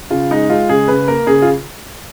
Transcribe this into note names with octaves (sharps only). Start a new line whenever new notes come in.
C#3 F4
G#3 D#4
G#3 F4
C#3 G#4
C#3 B4
A#3 A#4
C#3 G#4
F4